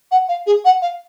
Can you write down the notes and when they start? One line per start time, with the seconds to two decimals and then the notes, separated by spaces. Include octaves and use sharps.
0.11 F#5
0.28 F5
0.46 G#4
0.65 F#5
0.82 F5